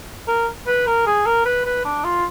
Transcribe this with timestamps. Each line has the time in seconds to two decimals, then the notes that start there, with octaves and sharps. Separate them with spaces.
0.27 A#4
0.67 B4
0.87 A#4
1.07 G#4
1.26 A#4
1.46 B4
1.65 B4
1.85 D4
2.04 F4